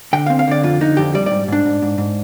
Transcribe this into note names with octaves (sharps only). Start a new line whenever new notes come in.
D3 G5
C4 F5
F5
D3 D5
F2 F4
D3 D#4
F2 G4
G3 D5
D5
G#2
G#2 D4
G#2
G#2
G#2